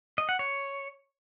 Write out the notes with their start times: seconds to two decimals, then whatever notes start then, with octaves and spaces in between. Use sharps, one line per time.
0.18 D#5
0.29 F#5
0.39 C#5